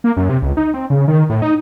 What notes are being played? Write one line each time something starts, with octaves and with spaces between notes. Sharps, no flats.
A#3
F#2
C3
C#2
D#4
C4
C#3
D#3
A2
D#4